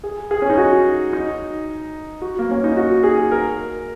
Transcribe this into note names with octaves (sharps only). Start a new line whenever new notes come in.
G#4
G#4
C#4
D#4
F#4
D#4
F#4
A#3
C#4
D#4
F#4
G#4
A#4